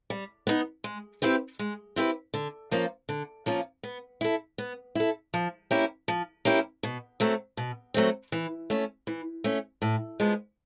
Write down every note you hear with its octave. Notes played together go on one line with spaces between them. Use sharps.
G3
B3 D#4
G#3
C4 E4 G4 B4
G#3
C4 E4 G4 B4
D3
F3 A#3 C#4 F4
D3
F3 A#3 C#4 F4
B3
E4 A4
B3
E4 A4
F3
A#3 C#4 E4 G4
F3
A#3 C#4 E4 G4
B2
F#3 A3 C4
B2
F#3 A3 C4
E3
A3 C#4
E3
A3 C#4
A2
F3 G#3 B3